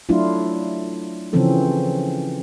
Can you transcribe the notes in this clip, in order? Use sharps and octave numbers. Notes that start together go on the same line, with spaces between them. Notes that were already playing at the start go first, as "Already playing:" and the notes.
F#3 A3 D4 E4 F4
C#3 E3 F3 C4 C#4 A4